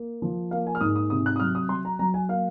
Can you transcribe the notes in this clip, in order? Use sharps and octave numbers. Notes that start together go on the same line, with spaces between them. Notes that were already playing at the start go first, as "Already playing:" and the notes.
Already playing: A#3
F3
A#3 F5
G#5
F6
G#2 D#6
D#6
C3 D#6
F#6
D#6
F#3 F6
D#6
F#3 C6
A#5
F#3 A#5
G#5
A#3 F5